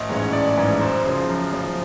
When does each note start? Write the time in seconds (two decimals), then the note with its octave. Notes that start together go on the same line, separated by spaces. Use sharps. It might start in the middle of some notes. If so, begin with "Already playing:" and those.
Already playing: A1 D#5
0.09 G#2 E3 G#3 C#4
0.33 A1 D5
0.57 G#2 E3 G#3 C#4
0.81 F#2 C5
1.06 C#3 F3
1.29 F#2
1.53 C#3 F3